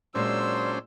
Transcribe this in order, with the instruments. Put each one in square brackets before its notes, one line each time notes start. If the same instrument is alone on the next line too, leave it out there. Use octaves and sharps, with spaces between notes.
[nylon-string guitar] A#2 G#3 [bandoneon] F#3 C5 [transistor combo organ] C#4 D4 C6 [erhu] E6